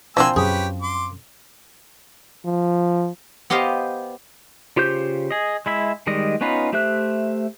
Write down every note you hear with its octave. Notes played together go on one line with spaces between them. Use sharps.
F3 A#3 C4 D4 E4 F#5 G#5 E6
F#2 G4 G#4 B4 C#5
C6 D6
F3
B3 G4 C5 D#5 F5
C#3 F4 G4 C5 G6
G#4 D#5
G#3 E4 E5
D#3 G3 G#3 D#5
B3 C#4 D#4 F4 B4
A3 G4 C5 E5 F#6